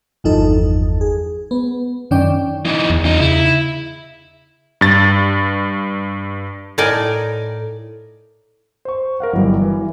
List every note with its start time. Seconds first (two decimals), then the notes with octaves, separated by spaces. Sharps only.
0.24 G1 E2 F3 D#4 A4
1.01 G#4
1.51 B3
2.11 F#2 D#3 C#4 D4 D5 G5
2.65 E3 D#4
2.90 E2
3.05 D#4 F4
3.20 C#3 E4
4.81 G2 A6
6.78 A2 D#4 A#4 D5 D#5 G#5
8.85 C5 C#6
9.20 A#4 F5 F#5
9.33 G1 E3 F#3 G3
9.62 E3